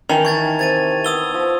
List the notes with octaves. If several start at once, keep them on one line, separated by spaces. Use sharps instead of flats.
D#3 E3 A5 F7
C#6 G#6 A6
C3 G#6 A6 D#7
B3 D#6 E6 G7
F3